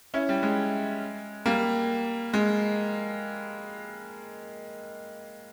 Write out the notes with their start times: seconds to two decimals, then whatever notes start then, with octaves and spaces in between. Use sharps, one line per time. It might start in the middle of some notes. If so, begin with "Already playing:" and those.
0.14 C#4 E4
0.29 G3
0.43 G#3
1.46 G3 A#3
2.34 G#3